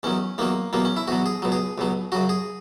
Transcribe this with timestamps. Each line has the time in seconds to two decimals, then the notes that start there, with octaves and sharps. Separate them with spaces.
0.03 E2 D#3 F#3 C#4
0.38 E2 D#3 F#3 A#3
0.73 E2 B2 F#3 A#3
0.85 C#4
0.97 E4
1.08 E2 B2 F#3 F#4
1.26 G#4
1.42 C#2 B2 F#3
1.52 G#4
1.78 C#2 B2 F#3
2.12 F#2 C#3 F#3 F#4
2.29 G#4